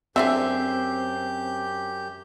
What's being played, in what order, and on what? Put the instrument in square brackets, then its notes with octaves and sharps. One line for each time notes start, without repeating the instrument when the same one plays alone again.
[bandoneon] F#2 G4 G6 [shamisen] D3 F4 G#4 [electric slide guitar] C4 [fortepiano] E5